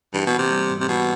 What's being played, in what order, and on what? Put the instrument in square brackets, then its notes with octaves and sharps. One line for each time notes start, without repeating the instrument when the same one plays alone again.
[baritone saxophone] G2 [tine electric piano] E3
[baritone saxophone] B2
[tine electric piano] A#3
[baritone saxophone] C3
[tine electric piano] G3
G#2
[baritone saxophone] C3
[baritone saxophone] B2 [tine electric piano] E3